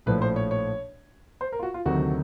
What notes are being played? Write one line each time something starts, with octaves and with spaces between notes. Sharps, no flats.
A#1 A2 F3 B4
C5
C#5
C#5
C5
A#4
F4
F#4
F4
D2 C3 D#3 F#3 A3 F#4